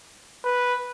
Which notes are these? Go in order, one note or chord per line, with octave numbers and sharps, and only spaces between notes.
B4